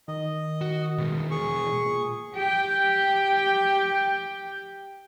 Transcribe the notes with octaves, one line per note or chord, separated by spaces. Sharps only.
D#3 D#5
F#4
B2 G#3
G#4 C#6
A#2
G4 G5